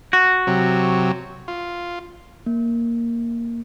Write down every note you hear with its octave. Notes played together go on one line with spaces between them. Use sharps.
F#4
C3 F#3
F4
A#3